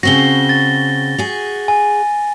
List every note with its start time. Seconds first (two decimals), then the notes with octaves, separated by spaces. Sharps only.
0.03 C#3 C4 F#4 A#6 G7
0.49 A6
1.18 F#4 G#4
1.68 G#5